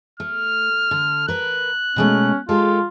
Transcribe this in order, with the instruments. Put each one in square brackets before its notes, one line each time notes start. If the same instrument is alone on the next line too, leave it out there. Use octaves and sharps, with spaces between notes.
[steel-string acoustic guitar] A3 [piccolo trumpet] F6
[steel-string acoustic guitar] D3
[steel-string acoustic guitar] A#4 B4 [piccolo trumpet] F#6
[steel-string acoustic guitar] B2 G#3 A3 [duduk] C#4
[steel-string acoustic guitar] G#3 G4 A4 [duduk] F4